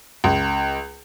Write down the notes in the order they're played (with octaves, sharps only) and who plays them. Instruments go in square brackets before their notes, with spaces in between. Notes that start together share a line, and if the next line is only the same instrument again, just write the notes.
[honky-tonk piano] C#2